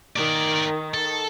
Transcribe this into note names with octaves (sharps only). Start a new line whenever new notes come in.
D#3 A#4 D5
A4